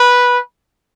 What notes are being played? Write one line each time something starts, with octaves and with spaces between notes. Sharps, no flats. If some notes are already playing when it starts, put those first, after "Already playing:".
Already playing: B4